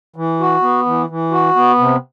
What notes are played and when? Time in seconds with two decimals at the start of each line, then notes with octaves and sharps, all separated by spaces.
0.16 E3
0.40 F#4
0.62 B3
0.86 E3
1.09 E3
1.31 F#4
1.56 B3
1.78 C3